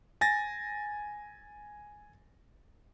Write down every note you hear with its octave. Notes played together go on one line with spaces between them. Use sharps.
G#5 A6 A#6